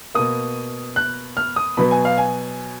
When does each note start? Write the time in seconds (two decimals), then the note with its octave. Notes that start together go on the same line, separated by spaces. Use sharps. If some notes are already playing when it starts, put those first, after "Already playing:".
0.15 B2 A#3 D#6
0.96 F#6
1.37 F6
1.56 D#6
1.77 B2 F#3 B3 B5
1.91 G#5
2.05 F5
2.18 G#5